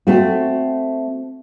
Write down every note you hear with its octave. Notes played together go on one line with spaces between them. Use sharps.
A3 C4 F#4